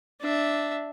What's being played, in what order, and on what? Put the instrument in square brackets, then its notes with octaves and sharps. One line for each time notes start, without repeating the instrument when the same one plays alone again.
[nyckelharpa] D4 E5